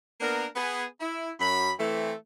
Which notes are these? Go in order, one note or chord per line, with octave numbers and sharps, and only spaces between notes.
A#3 B3 D4 A#4
B3 G#4
E4
F#2 B5
E3 A3 C4